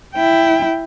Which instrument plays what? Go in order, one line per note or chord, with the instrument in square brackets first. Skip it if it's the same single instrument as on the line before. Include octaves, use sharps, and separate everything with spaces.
[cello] E4 G5